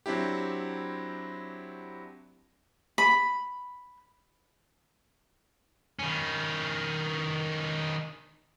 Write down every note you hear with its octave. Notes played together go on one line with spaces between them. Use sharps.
F#3 C4 D4 E4 G4
B5
D#3 C#4